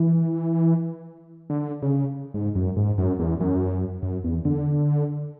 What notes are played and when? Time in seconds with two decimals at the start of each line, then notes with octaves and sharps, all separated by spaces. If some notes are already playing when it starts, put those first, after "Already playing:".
Already playing: E3
1.50 D3
1.82 C#3
2.34 G#2
2.55 F#2
2.76 G#2
2.98 F#2
3.19 E2
3.40 F#2
4.03 F#2
4.24 E2
4.45 D3